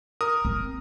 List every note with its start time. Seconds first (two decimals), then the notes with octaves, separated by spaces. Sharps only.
0.21 A#4 D#6
0.45 C4